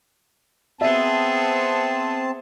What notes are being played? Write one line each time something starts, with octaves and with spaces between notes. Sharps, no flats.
B3 C4 G#4 E5 A5